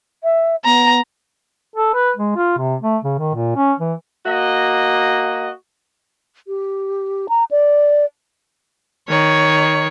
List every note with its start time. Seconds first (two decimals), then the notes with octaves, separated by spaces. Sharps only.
0.24 E5
0.65 B3 A#5
1.76 A4
1.94 B4
2.17 G#3
2.36 F4
2.58 C3
2.82 A3
3.04 C#3
3.19 D#3
3.35 A#2
3.56 C#4
3.80 E3
4.26 A#3 F#4 D#5
6.48 G4
7.29 A#5
7.51 D5
9.08 D#3 C#5